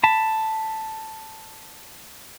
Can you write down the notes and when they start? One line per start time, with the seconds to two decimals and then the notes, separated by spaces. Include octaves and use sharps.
0.04 A5 B5